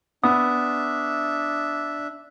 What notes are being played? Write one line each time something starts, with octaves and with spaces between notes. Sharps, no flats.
B3 D4 E5 D#6